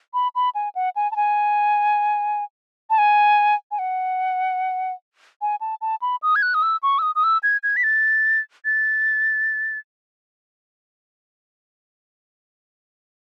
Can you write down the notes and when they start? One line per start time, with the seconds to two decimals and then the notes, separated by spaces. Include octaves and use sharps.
0.14 B5
0.35 B5
0.55 G#5
0.75 F#5
0.96 G#5
1.11 A5
1.16 G#5
2.90 A5
2.98 G#5
3.71 G#5
3.79 F#5
5.42 G#5
5.61 A5
5.81 A5
6.02 B5
6.23 D#6
6.36 G#6
6.42 F#6
6.54 D#6
6.63 E6
6.83 C#6
6.99 E6
7.02 D#6
7.15 D#6
7.24 E6
7.43 G#6
7.63 G#6
7.77 B6
7.84 A6
8.65 A6